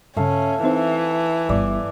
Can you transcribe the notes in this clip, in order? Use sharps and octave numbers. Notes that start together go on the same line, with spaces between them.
G2 C#3 A3 C#4 F5
E3 C4 D#4 C5
G1 D5